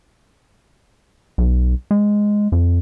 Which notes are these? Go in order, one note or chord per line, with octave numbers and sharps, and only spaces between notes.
B1
G#3
F2